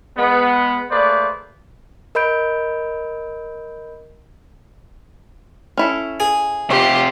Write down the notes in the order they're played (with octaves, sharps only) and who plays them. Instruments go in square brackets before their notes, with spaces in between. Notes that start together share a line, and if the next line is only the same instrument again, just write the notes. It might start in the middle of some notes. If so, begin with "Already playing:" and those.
[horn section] G#3 B3
A3 A#3 G#4 B4 C5 D5
[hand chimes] A#4 D#5 B5 G6 D7
[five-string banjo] C#4 E4 A4
[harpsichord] G#4
[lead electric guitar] C3 F4 [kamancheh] G4